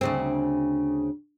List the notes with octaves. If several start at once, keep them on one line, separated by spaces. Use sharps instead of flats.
D2 C#3 C4